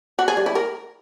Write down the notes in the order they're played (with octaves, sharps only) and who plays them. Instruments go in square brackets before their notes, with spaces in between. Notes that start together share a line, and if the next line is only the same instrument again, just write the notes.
[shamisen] F#4
G#4
G3
E4
A#4